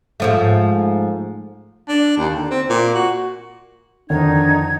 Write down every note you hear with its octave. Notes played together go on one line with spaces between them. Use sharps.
G#2 F3 A3
D4
D#2
D3
C4
A#2
F#4
F2 D3 D#3 D4 D#4 G#6